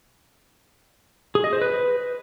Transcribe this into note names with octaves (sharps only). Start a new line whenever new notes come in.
G#4
D#5
C5
B4